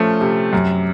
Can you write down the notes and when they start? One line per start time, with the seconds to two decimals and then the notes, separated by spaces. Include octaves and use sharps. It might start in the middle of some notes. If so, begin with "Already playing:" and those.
Already playing: F3 A3 C#4
0.21 C3
0.53 F#2